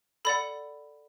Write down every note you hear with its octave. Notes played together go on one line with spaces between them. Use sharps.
A4 D5 F#5 B5